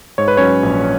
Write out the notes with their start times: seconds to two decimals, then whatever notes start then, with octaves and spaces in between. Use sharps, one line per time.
0.18 G#2 C#5
0.28 B4
0.37 F#3 C#4 C#5
0.63 A#1